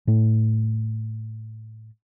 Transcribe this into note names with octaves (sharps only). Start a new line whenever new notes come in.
A2 A3